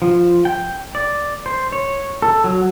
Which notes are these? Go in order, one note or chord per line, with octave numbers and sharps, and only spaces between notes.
F3
G5
D5
C5
C#5
A4
F#3